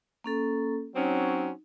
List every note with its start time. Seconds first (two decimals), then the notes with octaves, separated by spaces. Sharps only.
0.24 A#3 C#4 A4
0.96 F#3 C4 C#4 D#4